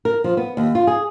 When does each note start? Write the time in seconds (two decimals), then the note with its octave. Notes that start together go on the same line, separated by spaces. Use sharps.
0.05 A#4
0.24 F3
0.37 B3
0.57 D#2
0.75 F4
0.87 G#4